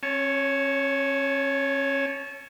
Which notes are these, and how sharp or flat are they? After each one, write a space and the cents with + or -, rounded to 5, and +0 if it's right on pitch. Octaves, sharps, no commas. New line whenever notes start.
C#4 -40 C#5 +0 A5 -30